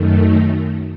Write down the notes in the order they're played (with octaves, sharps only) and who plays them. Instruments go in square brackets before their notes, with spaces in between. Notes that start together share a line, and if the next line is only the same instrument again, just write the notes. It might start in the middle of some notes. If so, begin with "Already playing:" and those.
Already playing: [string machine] F#2 D#3 A3
D#4